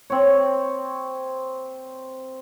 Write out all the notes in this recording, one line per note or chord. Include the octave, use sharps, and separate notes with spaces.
C4 C#5